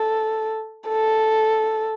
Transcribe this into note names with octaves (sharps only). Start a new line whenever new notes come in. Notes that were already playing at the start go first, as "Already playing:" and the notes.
Already playing: A4
A4